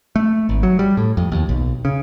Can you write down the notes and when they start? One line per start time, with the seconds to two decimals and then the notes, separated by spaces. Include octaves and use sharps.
0.16 A3
0.49 G#1
0.63 F#3
0.79 G3
0.97 A2
1.17 F2
1.32 D#2
1.49 B1
1.85 C#3